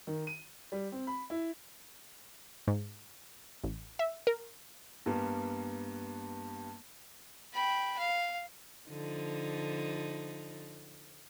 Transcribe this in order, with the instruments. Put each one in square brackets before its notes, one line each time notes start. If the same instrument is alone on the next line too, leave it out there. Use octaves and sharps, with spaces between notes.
[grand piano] D#3
D#7
G3
C4
B5
E4
[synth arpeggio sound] G#2
A1
E5
A#4
[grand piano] G2 G3 A#3 B3
[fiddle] G5 B5
F5
[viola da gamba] D3 F3 D#4